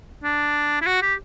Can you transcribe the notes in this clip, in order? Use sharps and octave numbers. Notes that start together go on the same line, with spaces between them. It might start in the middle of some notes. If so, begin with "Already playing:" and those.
D4
E4
F#4
G4